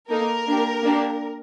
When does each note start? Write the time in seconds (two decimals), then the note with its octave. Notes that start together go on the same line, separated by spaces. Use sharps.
0.09 A#3 D#4 A4 A#4
0.47 A#3 D4 G4
0.83 A#3 D4 G4